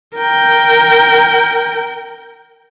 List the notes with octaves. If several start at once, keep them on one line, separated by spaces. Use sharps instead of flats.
A#4 G5